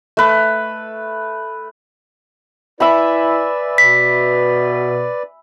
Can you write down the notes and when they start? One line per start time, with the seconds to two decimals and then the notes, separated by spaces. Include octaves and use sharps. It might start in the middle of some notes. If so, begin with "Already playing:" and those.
0.17 A3 B4
2.80 E4 B4 D5 E5 G#5 B5
3.78 B2 B6